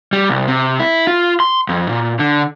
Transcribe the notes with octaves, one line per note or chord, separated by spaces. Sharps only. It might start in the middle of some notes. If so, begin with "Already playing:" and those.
G3
C2
C3
E4
F4
C6
F2
A#2
D3